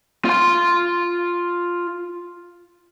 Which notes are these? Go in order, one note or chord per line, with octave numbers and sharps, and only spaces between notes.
F4 C6